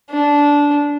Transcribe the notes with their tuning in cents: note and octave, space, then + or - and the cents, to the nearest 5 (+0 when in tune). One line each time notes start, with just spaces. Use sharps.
D4 -15